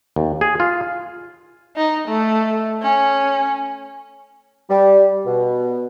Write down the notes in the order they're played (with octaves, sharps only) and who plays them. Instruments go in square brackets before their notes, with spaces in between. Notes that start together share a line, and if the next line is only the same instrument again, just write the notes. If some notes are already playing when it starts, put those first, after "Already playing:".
[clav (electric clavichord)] D#2
G#4
F4
[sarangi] D#4
A3
C#4
[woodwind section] G3
B2